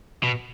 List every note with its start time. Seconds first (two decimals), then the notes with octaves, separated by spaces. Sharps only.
0.23 B2